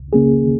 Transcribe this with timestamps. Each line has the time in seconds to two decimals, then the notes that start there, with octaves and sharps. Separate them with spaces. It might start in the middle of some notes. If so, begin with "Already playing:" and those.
Already playing: C#2
0.13 C#3 A#3 C#4 G#4